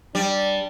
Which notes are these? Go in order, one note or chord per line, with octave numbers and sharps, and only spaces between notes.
G3 D4